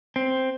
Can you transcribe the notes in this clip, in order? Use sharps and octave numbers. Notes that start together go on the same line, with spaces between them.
C4